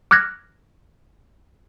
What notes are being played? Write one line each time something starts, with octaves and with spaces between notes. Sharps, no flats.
D6 F6 F#6 G#6 A#6